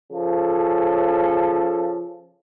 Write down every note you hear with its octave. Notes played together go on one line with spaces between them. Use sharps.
C#3 F3 C#4 A4